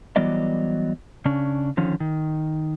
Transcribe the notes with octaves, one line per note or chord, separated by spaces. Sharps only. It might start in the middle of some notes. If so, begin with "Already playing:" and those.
E3 F#3 G3 B3 D5 D#5
C#3 C#4 D4
D3 D#3 F3 C#4
D#3